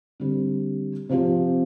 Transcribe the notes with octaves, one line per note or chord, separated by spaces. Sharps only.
D3 G3 C4
C3 F3 C4 G4 C5